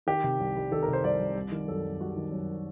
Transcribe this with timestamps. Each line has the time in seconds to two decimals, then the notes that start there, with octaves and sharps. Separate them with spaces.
0.07 D#3 G4
0.24 C3
0.40 C2
0.56 G3
0.72 D#3 A4
0.83 A#4
0.88 C3
0.93 C5
1.04 C2 D5
1.20 G3
1.35 G3
1.52 D#3
1.68 F#2 A4
1.84 F#2
2.00 G3 F#4
2.16 D#3
2.32 F#2